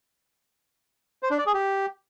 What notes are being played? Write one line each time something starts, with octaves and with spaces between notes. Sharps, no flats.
C5
D4
D5
G#4
G4